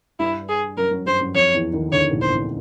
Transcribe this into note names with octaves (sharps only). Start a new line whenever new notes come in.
G2 G3 E4
G#4
F#2 F#3 A#4
F#2 F#3
G2 G3 C5
F#2 F#3
F2 F3 C#5
E2 E3
D#2 D#3
D2 D3 C#5
A#1 A#2
C5
A1 A2